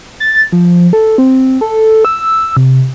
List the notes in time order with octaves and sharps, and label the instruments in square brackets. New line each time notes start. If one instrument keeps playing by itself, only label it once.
[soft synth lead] A6
F3
A4
C4
A4
E6
C3